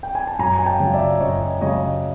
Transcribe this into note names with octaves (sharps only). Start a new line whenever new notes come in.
G5
G#5
A5
F#2 G#5 A#5
G#5
G5 A5
C#3 F#3
D5 E5
F#2 C#5 D#5
C#3 F#3 C#5 D#5